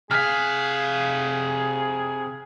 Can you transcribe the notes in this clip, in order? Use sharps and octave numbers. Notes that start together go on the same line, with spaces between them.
C3 G#4 F5 F6 F#6 B6